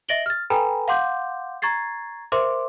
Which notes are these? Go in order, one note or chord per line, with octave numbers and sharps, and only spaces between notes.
D#5 E5 A#6 D7 F#7 G7
F6 A6
A4 B4 G5 G#5 A#5 B5
F5 F#5 C6 D6 G6
A#5 C#6 G#6 A6 C7
A#4 C5 E5 C6 D6